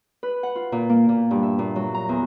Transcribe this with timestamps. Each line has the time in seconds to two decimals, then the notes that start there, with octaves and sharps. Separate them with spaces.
0.23 B4
0.43 F#5
0.55 F4
0.72 A#2
0.89 A#3
1.09 A#2
1.31 G2
1.43 E5
1.59 A#2
1.76 F#3
1.94 A#5
2.09 E2